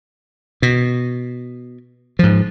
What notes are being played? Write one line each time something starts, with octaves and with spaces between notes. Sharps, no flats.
B2
G#2 F3